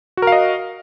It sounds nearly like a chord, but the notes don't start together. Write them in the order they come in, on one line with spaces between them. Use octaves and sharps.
F#4 A#4 F5 D#5